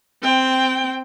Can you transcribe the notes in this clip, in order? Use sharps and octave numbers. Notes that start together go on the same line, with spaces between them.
C4 G5